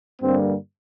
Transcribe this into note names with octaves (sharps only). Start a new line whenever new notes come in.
G2 D3 G3 A#3 C4